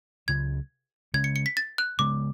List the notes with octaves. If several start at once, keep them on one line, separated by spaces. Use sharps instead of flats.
C#2 C#3 F#3 G#6
C#3 G#3 C#4 G#6
C#7
C#7
B6
A6
F#6
C#3 G#3 B3 D6